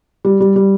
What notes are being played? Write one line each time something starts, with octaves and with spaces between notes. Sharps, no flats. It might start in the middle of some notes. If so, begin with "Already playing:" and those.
G3
G3
G3